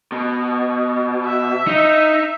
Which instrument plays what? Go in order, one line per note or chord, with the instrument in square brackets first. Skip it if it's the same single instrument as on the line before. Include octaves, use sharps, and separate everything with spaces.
[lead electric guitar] B2
[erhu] E5
[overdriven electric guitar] D#4 D#5